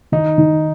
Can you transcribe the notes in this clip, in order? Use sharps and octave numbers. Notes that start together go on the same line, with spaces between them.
D#3 D#4
D#3